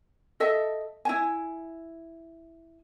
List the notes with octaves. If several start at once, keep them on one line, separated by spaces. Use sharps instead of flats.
A4 D#5 E5
E4 G#5